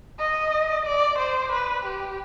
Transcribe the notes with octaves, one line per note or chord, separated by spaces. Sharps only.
D#5
D5
C5
B4
G4